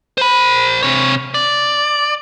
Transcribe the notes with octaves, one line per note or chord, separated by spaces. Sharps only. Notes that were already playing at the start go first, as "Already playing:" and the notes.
C5 B5
C3 C#5
D5